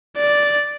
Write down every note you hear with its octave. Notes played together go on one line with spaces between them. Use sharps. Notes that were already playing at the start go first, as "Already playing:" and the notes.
D5